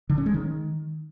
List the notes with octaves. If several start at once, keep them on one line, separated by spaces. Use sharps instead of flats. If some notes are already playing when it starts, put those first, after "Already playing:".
D3
C#4
G#3
D#3